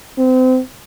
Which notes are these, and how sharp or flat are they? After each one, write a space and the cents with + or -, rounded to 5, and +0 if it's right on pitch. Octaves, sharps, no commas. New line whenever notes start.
C4 -30